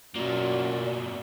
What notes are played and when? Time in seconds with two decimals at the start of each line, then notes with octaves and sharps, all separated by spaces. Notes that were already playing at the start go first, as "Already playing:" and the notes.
0.15 F#2 B2 A#3 F4 D5